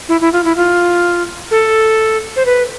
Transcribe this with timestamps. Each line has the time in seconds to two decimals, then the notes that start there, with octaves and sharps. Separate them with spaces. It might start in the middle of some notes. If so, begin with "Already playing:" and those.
0.09 E4
0.21 E4
0.33 F4
0.44 E4
0.57 F4
1.51 A4
2.36 C5
2.46 B4